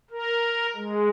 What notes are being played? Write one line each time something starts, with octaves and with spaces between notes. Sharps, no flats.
A#4
G#3